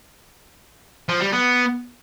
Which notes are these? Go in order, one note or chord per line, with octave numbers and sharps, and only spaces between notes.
F3
G3
B3